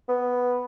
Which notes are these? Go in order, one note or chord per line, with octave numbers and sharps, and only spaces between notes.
B3